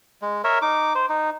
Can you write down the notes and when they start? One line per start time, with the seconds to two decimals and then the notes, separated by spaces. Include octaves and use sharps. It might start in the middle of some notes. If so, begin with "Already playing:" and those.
0.22 G#3
0.44 A#4 C#5 E5
0.62 D#4 D6
0.95 C5
1.09 D#4